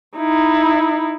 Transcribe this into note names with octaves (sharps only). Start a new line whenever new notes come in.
D#4 E4